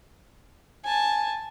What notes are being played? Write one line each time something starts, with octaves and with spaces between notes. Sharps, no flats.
G#5 A5